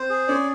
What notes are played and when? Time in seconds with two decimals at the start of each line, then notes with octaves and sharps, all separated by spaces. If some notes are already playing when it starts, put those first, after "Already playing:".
Already playing: C4 C5
0.10 G#4
0.28 C#4 D5